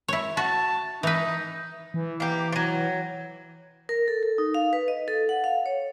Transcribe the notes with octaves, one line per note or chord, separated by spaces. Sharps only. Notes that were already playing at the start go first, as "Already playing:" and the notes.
E4 C#5
F#4 A5
E3 D#4 B4
E3
A#3 G4
F3 F#3
A#4
A4
A4
D#4
F5
B4
D#5
A4
F#5
F5
C#5